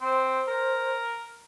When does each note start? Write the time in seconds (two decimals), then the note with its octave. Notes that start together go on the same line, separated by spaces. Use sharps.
0.01 C4 C5
0.48 A#4